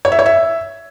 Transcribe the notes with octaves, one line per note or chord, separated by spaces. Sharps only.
C#5
E5
C#5
E5